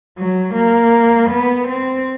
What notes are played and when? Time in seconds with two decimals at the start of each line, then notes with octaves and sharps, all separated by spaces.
0.18 F#3
0.56 A#3
1.31 B3
1.68 C4